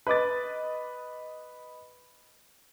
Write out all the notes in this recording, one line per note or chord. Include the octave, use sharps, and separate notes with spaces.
B4 D#5 D6 A6